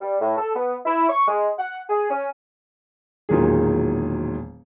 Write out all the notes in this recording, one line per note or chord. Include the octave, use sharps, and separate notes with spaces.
G3
A2
A4
B3
E4
C#6
G#3
F#5
G#4
C#4
E1 A#2 D#3 F#3 G#4